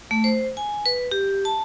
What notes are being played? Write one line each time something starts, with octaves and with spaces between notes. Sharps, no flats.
A3
C5
G#5
B4
G4
A5